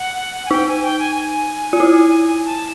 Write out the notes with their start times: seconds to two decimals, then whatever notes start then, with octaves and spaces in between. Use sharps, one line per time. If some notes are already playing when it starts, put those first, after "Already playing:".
Already playing: F#5
0.46 G#5
0.51 D#4 G5
0.68 G#5
0.83 G5
0.99 G#5
1.16 G#5
1.73 F4
1.80 E4
2.45 A5